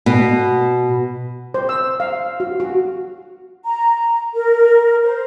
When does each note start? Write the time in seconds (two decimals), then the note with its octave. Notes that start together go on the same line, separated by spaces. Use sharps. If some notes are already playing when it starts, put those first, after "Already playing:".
0.06 B2
1.54 C5
1.69 E6
2.00 F5
2.40 F#4
2.60 F#4
3.64 A#5
4.34 A#4
5.04 C5